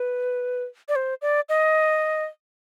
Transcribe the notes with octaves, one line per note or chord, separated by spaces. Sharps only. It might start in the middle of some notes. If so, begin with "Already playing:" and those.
Already playing: B4
D5
C5
D5
D#5